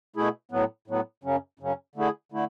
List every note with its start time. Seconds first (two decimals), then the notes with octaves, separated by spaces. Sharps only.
0.16 B2 A3 E4 G#4
0.51 A2 F#3 B3
0.88 A2 F#3 B3
1.24 F#2 C#3 F#3 C#4
1.59 F#2 C#3 F#3 C#4
1.95 D3 A3 E4 G#4
2.32 D3 A3 E4